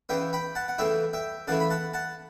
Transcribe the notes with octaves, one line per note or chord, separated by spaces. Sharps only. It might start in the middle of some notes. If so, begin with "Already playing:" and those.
C#3 E3 B3 E5 G5
G5 B5
F#5 A5
F#5
C#3 E3 A3 E4 E5 G5
E5 G5
C#3 E3 A3 E4 F#5 A5
B5
F#5 A5
F#5 A5